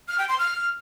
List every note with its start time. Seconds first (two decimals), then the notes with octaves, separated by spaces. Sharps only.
0.08 F6
0.18 G5
0.29 C6
0.39 F6